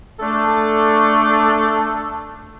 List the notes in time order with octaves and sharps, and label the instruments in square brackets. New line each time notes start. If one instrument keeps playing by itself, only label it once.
[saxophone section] A3 D4 A4